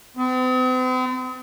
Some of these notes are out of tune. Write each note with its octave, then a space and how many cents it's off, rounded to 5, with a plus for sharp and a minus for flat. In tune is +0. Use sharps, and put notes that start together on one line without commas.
C4 -45